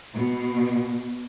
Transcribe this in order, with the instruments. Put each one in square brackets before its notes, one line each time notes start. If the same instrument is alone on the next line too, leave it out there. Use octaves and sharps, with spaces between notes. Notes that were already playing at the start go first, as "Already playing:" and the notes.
[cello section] B2